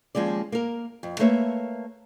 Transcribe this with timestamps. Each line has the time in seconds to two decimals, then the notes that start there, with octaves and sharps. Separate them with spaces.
0.15 D#2 F3 G#3 C#4 D5
0.52 A#3 A#4
1.03 F2
1.19 A3 A#3 B4 C#5 E5